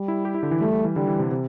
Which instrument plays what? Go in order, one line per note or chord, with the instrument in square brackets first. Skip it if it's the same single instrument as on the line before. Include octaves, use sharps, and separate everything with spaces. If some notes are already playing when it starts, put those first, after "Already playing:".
Already playing: [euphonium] G3
[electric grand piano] E4
G4
E4
D3
E3
[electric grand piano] G3 [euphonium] A3
[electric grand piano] G3
E3
[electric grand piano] D3 [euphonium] G3
[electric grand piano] E3
C3
C3